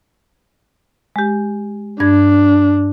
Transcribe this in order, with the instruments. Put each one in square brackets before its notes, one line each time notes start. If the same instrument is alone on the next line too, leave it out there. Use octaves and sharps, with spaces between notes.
[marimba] G#3 G4
[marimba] G2 G#6 [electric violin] D4